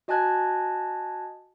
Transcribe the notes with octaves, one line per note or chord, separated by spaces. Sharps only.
F#4 D#5 G#5 A5 F#6 G#6